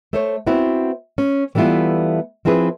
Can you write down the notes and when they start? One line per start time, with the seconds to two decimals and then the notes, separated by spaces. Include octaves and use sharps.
0.13 A3 C5 C#5
0.47 B3 C4 E4 F#4
1.18 C#4
1.55 E3 G3 A3 B3 E4 F4
2.45 F3 C4 E4 G#4 B4